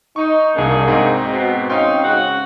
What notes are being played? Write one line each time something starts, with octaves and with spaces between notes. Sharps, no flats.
D#4 C#6
C2 A#3 D4 F#4 G#4
G#2 C4 D#4
B2
C4 C#4 D#4 F5 G5 C6
G#2 C#3 F#4